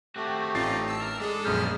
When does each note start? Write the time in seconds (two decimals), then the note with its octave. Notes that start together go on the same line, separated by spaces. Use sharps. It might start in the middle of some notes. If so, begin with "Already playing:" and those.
0.16 A3 C4 F#4 G4
0.55 A1 C4 C#4 D#4 F4 A6 C7
0.88 A5 E6
1.01 A#4
1.20 G#3 D4 G#4 A4
1.45 A#1 F#2 B3 C#4 F6 G6